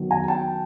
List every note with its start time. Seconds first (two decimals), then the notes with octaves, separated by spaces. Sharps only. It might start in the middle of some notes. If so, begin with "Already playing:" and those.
Already playing: D#3 F#3 B3
0.11 G#5 A#5
0.28 G5 A5